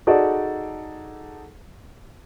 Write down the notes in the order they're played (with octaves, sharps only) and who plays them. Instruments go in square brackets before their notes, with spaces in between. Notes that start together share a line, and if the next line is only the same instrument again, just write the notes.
[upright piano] D#4 F#4 G#4 A4 D5